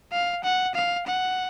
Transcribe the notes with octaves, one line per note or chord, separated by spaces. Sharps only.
F5
F#5
F5
F#5